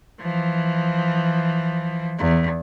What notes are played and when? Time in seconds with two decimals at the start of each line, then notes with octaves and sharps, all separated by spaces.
0.21 E3 F3
2.19 E2